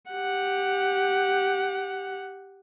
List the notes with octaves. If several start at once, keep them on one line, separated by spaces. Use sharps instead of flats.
G4 F#5